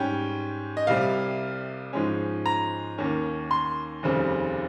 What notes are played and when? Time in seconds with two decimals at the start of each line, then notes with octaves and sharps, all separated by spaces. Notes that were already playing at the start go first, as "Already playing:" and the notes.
Already playing: G#2 G3 C#4 G5
0.77 D#5
0.87 C2 C3 G3 F5
1.93 G#2 F3 G#3 C#4
2.46 A#5
2.98 D#2 D#3 A#3 C#4
3.51 C6
4.03 F1 D#2 C#3 G3 C4